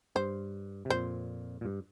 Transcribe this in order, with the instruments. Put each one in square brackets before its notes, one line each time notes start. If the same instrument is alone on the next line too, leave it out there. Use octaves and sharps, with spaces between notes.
[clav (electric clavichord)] G2 [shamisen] C5
[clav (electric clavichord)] C3
[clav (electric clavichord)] F2 A#2 [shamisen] C5
[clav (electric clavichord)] A#2
G2